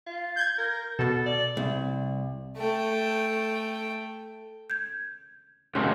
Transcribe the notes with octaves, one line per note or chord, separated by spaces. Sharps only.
F4
G6 G#6
A#4
B2 A4
D5
C2
A3 G5
G6 G#6
C#2 F#2 C6